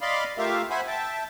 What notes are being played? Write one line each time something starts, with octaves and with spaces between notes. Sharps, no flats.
D5 D#5 F5 B5 C6
A3 F4 G4 A#4 E5 F5
C5 E5 F#5 G#5 B5
E5 G5 A5